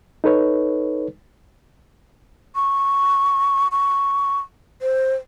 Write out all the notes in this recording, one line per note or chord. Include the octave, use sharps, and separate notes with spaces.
D#4 A4 B4 C#5
C#6
C#6
C5